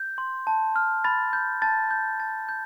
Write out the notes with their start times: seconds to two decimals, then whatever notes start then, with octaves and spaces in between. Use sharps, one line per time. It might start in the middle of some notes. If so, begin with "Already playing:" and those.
Already playing: G6
0.18 C6
0.47 A5
0.76 F6
1.04 B5 A6
1.33 G6
1.62 A5 A6
1.91 G6
2.20 A5 A6
2.49 G6